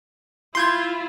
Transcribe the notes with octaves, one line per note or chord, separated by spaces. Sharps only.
E4 F4 C6 G6 G#6